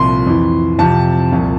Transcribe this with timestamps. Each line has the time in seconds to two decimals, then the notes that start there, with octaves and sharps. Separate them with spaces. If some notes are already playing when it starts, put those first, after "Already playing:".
Already playing: C2 A#2 F3 C6
0.26 F2 E3
0.79 F2 C3 F3 A5
1.32 C2 A#2 F3